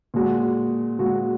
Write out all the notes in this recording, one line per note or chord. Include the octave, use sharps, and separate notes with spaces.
A#2 G#3 F#4
A#2 G#3 F#4